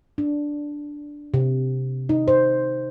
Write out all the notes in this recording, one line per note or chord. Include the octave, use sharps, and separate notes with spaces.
D4
C3
D#4
C5